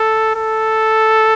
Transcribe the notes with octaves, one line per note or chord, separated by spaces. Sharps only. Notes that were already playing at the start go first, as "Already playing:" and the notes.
Already playing: A4
A4